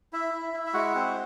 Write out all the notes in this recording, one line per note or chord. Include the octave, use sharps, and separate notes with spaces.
E4 E5
E4
E4
E5
G#3 F#4 F#5
C4